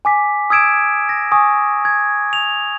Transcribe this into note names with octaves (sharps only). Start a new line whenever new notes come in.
G#5 D6 B6
D#6 E6 G#6 D7 E7
A#6
G#5 C#6 D#6
G#6
F7